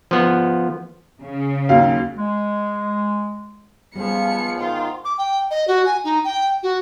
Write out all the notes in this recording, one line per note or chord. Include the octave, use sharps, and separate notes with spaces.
F3 B3
C#3
D#2 F#3 F5
G#3
C#2 F3 G3 B3 G#4 C#7
G#2 D#3 F4 G5
D6
G5
D#5
F#4
G#5
D#4
G5
F#4